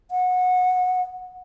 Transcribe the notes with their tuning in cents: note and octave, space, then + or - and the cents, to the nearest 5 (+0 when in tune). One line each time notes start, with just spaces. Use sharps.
F#5 -20